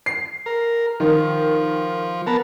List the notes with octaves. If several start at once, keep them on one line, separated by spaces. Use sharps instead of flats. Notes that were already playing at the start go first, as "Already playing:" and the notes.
C7
A#4
D#3 F3
B3 A#4 A5